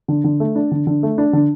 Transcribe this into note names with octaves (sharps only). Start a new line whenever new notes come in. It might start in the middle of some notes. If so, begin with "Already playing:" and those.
D3
D3
A3
D4
D3
D3
A3
D4
D3